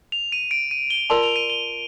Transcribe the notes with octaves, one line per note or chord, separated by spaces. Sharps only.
F7
D#7
D7
D#7
G7
F4 A#4 D5 A5 C6 F7
F7
D#7
G7